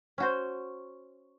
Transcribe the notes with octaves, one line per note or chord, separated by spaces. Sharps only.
C#4 F#4 C5